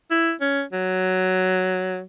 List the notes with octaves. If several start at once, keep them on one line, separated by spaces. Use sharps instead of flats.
E4
C#4
F#3